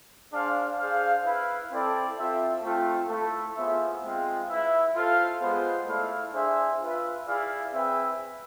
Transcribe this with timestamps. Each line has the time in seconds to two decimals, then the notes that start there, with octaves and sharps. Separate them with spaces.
0.32 D4 G#4 C5 F5
0.78 D4 G#4 C5 F5
1.24 E4 B4 F5
1.71 C4 E4 A4 D5
2.17 C4 F4 A4 E5
2.63 A3 C4 F4
3.09 A3 E4 A4
3.56 B3 F4 G#4 C5 E5
4.03 G#3 C4 F4
4.48 E4 B4 E5
4.94 F4 A4 C5 F5
5.40 G#3 B3 F4 G#4 C5
5.87 A3 E4 A4 D5 F5
6.33 D4 G#4 C5 E5
6.79 F4 B4 E5
7.27 E4 G#4 D5 F5
7.72 C4 G#4 B4 E5